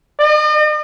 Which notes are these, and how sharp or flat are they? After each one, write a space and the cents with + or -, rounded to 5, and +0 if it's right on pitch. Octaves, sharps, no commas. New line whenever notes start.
D#5 -45